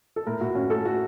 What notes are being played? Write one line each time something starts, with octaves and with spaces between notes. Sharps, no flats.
A4
A2 A#4
A2 F#4
C#4 F#4
A3 A4
A3 F#4